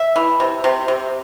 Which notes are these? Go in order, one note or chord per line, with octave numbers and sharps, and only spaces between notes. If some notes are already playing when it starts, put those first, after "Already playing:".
Already playing: E5
E3
C3
C3
C3